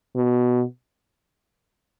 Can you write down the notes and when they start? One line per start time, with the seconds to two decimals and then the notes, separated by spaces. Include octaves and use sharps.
0.16 B2